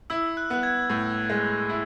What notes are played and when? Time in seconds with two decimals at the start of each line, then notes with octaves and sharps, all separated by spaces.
0.10 E4 E6
0.37 F#6
0.50 B3 F#6
0.63 G#6
0.90 A2
1.30 G#3
1.69 E4